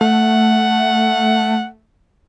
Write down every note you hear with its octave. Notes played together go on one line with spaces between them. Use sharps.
A3 F#5